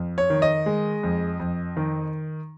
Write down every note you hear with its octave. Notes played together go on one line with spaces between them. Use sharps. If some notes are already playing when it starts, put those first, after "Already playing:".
Already playing: F2
C#5
D#3
D#5
G#3
F2
F2
D#3